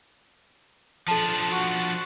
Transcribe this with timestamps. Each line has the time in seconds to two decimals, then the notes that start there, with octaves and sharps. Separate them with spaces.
1.08 F3 D4 A4 A5
1.52 F#4